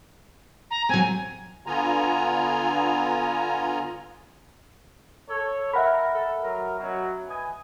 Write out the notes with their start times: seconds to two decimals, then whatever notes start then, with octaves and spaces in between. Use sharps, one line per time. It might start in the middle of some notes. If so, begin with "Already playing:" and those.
0.71 A#5
0.89 F#3 C4 G#5
1.66 D3 B3 F4 G#5 A#5
5.29 A4 C#5
5.74 A#4 E5 F#5 B5
6.14 A4
6.43 F#3 A#4
6.79 F#2 B2 F#3
7.29 B4 D#5 G#5